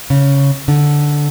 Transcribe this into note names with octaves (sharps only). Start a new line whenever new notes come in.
C#3
D3